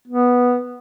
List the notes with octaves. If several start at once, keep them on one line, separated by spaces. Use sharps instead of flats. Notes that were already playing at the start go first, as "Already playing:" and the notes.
B3